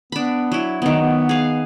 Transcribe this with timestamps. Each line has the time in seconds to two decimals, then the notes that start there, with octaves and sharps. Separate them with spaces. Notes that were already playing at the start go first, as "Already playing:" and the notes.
0.12 B3 D4 B5
0.52 F#3 E4
0.82 D#3 F#3 B3
0.99 B3
1.29 G#4 F5